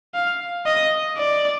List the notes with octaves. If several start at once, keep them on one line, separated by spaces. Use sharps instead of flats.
F5
D#5
D5